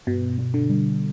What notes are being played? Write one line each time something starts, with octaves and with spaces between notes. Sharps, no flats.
G2 B2
B3
D3
G3